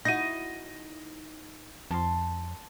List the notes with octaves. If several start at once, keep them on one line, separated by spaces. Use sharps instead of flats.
D#4 E4 F#4 A#6 D#7
F2 A5 C6